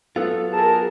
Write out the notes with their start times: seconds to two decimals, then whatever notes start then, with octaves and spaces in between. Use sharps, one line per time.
0.16 F#3 B3 F4 A4
0.53 G#4 A#4 A5